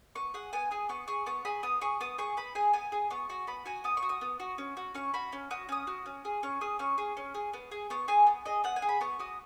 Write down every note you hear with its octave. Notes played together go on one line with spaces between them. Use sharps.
B3 C#6
G#4 F#5
B3 G#5
G#4 D#6
B3 C#6
G#4 C#6
B3 C#6
G#4 B5
B3 D#6
G#4 C#6
B3 D#6
G#4 C#6
B3 B5
G#4 G#5
B3 G#5
G#4
B3 C#6
F#4 C#6
B3 B5
F#4 G#5
B3 D#6
C#6
F#4
D#6
B3
F#4
C#4
F#4
C#4 C#6
F#4 B5
C#4
F#4 D#6
C#4 D#6
F#4
C#4
G#4
C#4 C#6
G#4 D#6
C#4 C#6
G#4
C#4
G#4
B3
G#4
B3 C#6
G#4 G#5
B3
G#4 D#5
B3 F#5
G#5
G#4
B5
B3 C#6
F#4 D#6